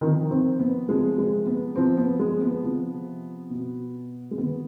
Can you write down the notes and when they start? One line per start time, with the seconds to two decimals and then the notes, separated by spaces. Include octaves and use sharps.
0.01 C3 D#3 F3 D#4
0.30 C3 C4
0.59 B3
0.88 C3 F3 G#3
1.18 G#3
1.47 B3
1.76 C3 F3 C4
1.97 B3
2.19 G#3
2.41 B3
2.63 C3 F3
3.50 B2
4.31 G#3
4.37 C3 D#3 B3